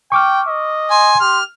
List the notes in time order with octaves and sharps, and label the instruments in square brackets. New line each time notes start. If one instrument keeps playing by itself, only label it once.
[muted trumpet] G5 [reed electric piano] C#6 D6 F6
[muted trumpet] D#5
[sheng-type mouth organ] G#5 [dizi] C6
[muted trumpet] G4 [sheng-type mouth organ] F6